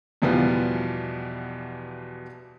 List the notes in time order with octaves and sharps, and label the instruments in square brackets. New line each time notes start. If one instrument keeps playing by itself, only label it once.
[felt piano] E2 B2 E3 F3 G3 B3